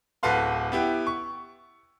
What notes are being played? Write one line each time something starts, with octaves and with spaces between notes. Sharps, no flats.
D1 F#4 A4 B4 F5 C6
B3 E4 G4 G5
C#6